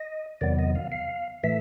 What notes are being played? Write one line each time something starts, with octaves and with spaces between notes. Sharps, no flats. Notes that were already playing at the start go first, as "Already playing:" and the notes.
Already playing: D#5
E2 C3 D#3 F#3 B3 D5
D#5
F5
F5
A2 E3 A3 E5